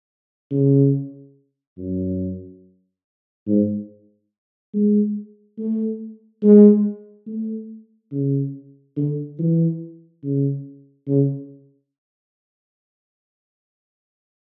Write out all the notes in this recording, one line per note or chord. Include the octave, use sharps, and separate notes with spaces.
C#3
F#2
G#2
G#3
A3
G#3
A3
C#3
D3
E3
C#3
C#3